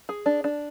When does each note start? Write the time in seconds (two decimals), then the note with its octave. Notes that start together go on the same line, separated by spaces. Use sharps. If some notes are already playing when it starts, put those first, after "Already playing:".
0.09 G#4
0.26 D4
0.44 D4